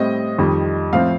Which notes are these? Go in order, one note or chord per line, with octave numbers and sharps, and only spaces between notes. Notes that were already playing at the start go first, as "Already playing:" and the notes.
Already playing: A2 G3 C4 D#5
F2 D#3 G3
A2 F3 C4 F5